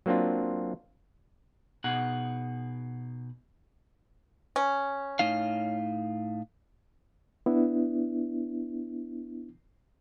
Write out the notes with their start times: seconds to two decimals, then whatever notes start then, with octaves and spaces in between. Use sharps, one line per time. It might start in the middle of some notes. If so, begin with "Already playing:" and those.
0.06 F#3 A#3 C4 D4 F4
1.84 B2 D#4 G#4 F#5
4.56 C#4
5.19 A2 D#4 F5
7.46 B3 D4 E4